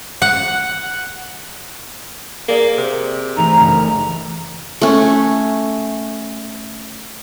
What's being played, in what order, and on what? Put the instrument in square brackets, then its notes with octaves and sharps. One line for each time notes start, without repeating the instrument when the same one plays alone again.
[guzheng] F#5
[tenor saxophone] A#3 [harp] G#4 D5
[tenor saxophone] C3
[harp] E3 A3 D#4 [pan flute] A#5
[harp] F#1 F6
[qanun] A3 C#4